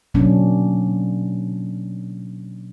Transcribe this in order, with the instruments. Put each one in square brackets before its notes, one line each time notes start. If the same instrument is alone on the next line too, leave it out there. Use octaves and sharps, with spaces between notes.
[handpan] B2 F#3 A#3 C#4 D4